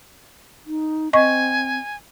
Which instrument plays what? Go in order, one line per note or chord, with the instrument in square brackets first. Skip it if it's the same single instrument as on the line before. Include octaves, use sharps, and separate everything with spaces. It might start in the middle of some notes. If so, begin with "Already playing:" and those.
[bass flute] D#4
[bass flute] C4 [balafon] D#5 C#6 [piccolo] G#5